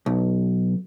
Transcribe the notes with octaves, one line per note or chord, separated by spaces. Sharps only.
B1